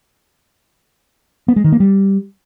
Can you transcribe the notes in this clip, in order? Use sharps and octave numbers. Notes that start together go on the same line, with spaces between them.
B3
G#3
D#3
A#3
G3